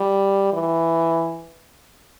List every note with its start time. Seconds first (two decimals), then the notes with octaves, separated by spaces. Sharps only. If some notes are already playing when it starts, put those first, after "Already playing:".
Already playing: G3
0.53 E3